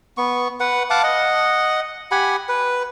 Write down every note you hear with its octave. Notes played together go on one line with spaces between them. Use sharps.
B3 C#6
B4 F#5
F5 F#5 A5 D6
D#5 F#5
G4 F#5 G#5 B5
B4